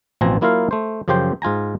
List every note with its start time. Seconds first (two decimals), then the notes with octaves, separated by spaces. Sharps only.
0.21 A1 B2 F3 C4 G#5 A#5
0.41 F#3 A#3 E4 F4 A#4 F5
0.71 A3 C5
1.08 F#2 C#3 F3 G4 C5 G5
1.42 G#2 F4 G#5 A#5